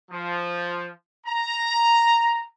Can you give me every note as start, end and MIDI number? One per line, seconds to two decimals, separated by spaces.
0.11 0.89 53
1.26 2.43 82